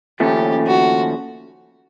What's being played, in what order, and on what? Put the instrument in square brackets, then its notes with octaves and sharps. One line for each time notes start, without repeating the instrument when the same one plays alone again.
[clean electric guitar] D#2 C#3 F3 A3 C#4 [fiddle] G4
[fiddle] F#4